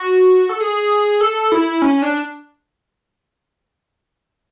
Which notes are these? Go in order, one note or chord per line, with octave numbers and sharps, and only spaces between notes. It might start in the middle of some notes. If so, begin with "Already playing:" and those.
Already playing: F#4
A4
G#4
A4
E4
C#4
D4